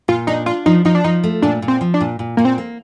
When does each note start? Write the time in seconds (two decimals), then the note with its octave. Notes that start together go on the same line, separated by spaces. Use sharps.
0.08 A#2 F4
0.27 D4 D#4
0.46 D4 F4
0.66 F3 D#4
0.85 F3 D#4
0.95 D4
1.04 F3 D#4
1.24 A3
1.42 A#2 D4
1.62 A#2
1.68 C4
1.81 F3
1.94 D4
2.01 A#2
2.19 A#2
2.37 A#2 A#3
2.45 C4
2.58 A#3